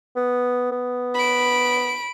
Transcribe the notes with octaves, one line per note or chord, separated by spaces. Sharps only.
B3
B3
B5 D7